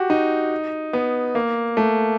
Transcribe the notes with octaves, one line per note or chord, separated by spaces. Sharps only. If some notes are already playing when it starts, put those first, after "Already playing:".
Already playing: F#4 G4
D#4
B3
A#3
A3